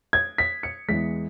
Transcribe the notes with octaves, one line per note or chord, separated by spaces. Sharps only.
G#6
B6
C#7
E2 E3 G#3 B6